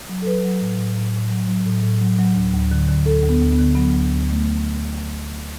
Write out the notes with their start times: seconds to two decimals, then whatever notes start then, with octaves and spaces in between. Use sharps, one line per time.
0.09 F#3
0.22 A4
0.26 F#3 B4
0.44 F#3
0.61 A2
0.78 A2
0.96 A2
1.14 A2
1.31 F#3
1.49 F#3
1.66 A2
1.83 A2
2.01 F#3
2.18 F#3
2.36 D2
2.54 D2
2.71 D3
2.89 D3
3.06 D2 A4
3.23 D2
3.29 B3
3.41 D2
3.53 B3
3.59 D3
3.75 F#3 B3
3.93 D2
4.10 D2
4.30 A3